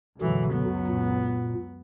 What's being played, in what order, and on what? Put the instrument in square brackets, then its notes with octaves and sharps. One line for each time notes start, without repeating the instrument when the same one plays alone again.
[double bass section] C#2 F#2 F#3 [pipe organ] B2 D3 [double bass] E3
[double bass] B3
[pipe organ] A#2